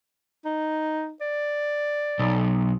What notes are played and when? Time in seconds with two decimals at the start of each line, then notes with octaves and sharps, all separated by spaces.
0.45 D#4
1.21 D5
2.19 B1